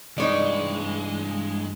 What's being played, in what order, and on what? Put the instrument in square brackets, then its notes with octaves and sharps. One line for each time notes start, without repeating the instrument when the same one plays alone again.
[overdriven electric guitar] G2 E3 [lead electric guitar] G#3 [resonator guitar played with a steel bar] D#4 C#5 D5